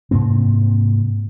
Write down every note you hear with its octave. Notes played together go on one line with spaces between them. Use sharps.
G#2 C3 A#3 C4